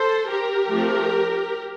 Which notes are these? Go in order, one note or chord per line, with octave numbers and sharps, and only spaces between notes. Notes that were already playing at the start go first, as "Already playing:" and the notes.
Already playing: A4 C5
G4 A#4
F3 A3 C4